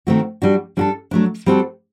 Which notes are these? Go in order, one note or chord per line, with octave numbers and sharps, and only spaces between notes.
D#3 A3 C4 F#4
G3 D4 F#4
G3 D4 F#4 A4
F#3 A3 D4
G3 C4 F#4 A4